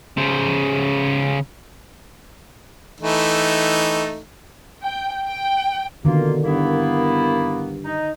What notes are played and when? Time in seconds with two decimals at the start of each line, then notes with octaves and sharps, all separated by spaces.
0.17 C#3 C5
3.01 E3 A3 D#4
4.83 G5
5.27 G5
6.05 B2 D3 D#3 A#3 F4
6.44 G2 A#3 B3 E4
7.84 D#4